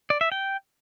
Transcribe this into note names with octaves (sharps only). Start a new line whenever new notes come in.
D5
E5
G5